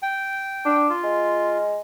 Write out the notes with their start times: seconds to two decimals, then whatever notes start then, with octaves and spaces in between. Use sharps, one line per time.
0.02 G5
0.65 D4
0.89 F4
1.04 G#3